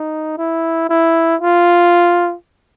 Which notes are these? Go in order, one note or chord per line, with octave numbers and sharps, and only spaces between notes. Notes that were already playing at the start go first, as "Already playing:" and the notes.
Already playing: D#4
E4
E4
F4